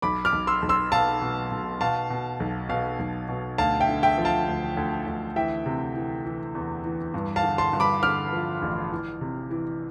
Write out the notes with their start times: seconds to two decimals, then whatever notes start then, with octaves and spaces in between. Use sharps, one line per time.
0.02 B1 B5 D6
0.25 D6 F6
0.32 B1
0.47 C6 E6
0.62 B1
0.69 C6 E6
0.92 B2 F5 A5
1.21 B2
1.51 B2
1.81 B2 F5 A5
2.10 B2
2.40 B1
2.69 B2 F5
2.99 B1
3.28 B2
3.58 D2 F5 A5
3.80 E5 G5
3.88 D3
4.03 E5 G5
4.18 F3
4.25 F5 A5
4.47 D2
4.77 D2
5.06 D2
5.36 E3 E5 G5
5.66 C3
5.95 E3
6.25 E3
6.55 E2
6.84 E3
7.14 G2
7.36 F5 A5
7.43 D3
7.58 A5 C6
7.73 G2
7.80 B5 D6
8.02 D3 D6 F6
8.33 F3
8.62 A1
8.92 E3
9.21 C3
9.50 E3